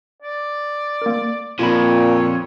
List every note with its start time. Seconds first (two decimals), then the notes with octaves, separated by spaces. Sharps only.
0.22 D5
1.02 A#3 A#4
1.59 F2 A#2 F4 C#5 B5